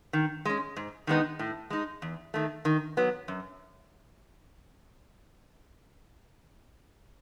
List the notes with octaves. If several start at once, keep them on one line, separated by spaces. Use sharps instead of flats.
D#3
G#3 C#4
G#2
D#3 G#3 B3 D#4
A2
G#3 D#4
E2
D#3 A3
D#3
F#3 B3
F#2